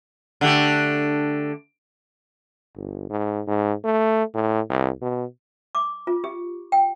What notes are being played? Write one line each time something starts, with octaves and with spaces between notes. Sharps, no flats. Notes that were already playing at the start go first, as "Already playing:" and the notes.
D3 A3 G4
G1
G#2
G#2
A3
A2
C2
B2
D6
F4
G4
G5